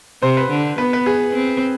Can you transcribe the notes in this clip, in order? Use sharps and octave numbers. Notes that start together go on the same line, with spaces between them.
C3 C5
B4
D3
B3 B4
B4
G#4
C4